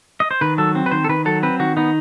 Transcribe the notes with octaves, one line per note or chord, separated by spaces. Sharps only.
D#5
C5
D#3 B4
F#3 A4
C4
B4
D#3 C5
A4
D#3 B4
F#3 A4
C4 B4
D#3 F#4
B3 D#4